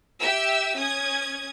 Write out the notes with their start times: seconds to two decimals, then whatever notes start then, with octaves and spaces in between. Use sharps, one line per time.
0.20 G4 E5 E6
0.77 C#4 D#6 G#6